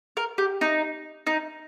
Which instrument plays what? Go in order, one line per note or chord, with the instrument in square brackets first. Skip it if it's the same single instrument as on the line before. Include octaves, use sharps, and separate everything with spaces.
[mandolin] A#4
G4
D#4
D#4